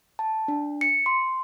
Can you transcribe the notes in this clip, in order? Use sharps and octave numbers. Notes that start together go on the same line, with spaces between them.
A5
D4
C#7
C6